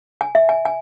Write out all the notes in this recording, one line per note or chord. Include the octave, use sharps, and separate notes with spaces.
G#5
E5
G#5
G#5